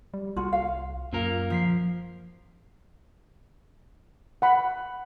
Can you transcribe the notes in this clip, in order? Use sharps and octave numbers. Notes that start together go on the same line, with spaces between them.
G3
C2 F4 F#4
F5
F#2 A#2 A#3 A#4
F3 B6 C7
F#5 B5